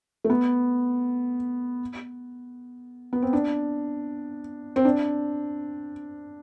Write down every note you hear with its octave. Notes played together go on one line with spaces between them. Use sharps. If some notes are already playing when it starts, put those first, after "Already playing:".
A3
B3
B3
C4
D4
C4
D4